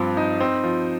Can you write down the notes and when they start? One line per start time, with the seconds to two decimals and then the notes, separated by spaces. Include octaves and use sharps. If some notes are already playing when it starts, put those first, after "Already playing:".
Already playing: G2 F3 C4
0.17 D#4
0.41 C4
0.63 F3